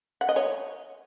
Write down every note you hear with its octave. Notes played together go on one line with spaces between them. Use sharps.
F#5
D#5
C#5